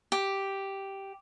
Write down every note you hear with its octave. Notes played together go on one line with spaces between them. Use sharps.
G4